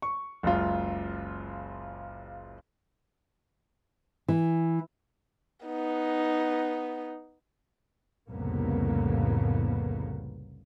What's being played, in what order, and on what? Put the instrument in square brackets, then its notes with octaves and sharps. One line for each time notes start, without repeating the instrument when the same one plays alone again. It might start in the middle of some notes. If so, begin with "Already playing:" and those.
[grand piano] C#6
F#1 C#2 F4
[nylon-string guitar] E3
[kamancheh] B3 D#4
[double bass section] C2 F2 A2 C#3 A#3 B3